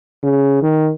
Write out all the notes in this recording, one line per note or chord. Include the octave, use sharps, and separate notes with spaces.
C#3
D#3